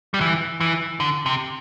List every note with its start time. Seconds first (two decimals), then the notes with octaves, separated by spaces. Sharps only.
0.14 G3
0.21 E3
0.61 E3
1.00 D3
1.26 C3